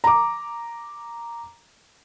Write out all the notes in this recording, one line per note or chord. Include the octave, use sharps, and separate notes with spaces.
A#5 D6